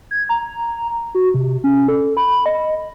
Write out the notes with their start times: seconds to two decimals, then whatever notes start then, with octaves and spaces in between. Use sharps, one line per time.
0.11 G#6
0.29 A#5
1.15 F#4
1.34 C3
1.64 C#4
1.88 A4
2.17 B5
2.46 D#5